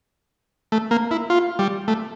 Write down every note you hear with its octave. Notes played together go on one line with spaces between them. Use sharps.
A3
A#3
E4
F4
G3
A3